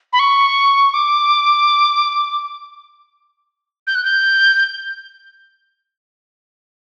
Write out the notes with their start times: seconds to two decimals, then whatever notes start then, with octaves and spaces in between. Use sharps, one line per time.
0.13 B5
0.19 C#6
0.94 D6
3.87 G6
3.95 F#6
4.04 G6